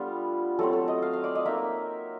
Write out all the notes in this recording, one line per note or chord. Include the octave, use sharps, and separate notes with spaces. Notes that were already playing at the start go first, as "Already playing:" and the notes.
Already playing: G3 A3 B3 D4 F4
F#3 A3 C4 A4
A4
D#5
F5
F5
D5
D#5
A#3 D#4 E5